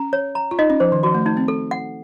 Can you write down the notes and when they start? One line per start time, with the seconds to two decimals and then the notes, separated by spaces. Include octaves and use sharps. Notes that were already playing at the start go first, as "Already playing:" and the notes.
Already playing: C#4 A#5
0.13 C#5
0.35 A#5
0.51 F4
0.59 D#4 D#5
0.70 C#4
0.80 F3 C5
0.92 D#3
1.03 F3 F#4
1.14 A3
1.26 A3 D#4
1.37 C4
1.48 A4
1.71 F#5